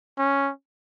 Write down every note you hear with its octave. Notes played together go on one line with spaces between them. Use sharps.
C#4